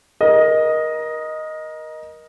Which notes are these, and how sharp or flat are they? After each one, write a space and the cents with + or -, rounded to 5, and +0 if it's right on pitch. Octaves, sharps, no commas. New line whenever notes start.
A#4 +25 D#5 +0